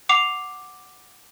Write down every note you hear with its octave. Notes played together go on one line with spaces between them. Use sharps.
F#5 D6 C7 F7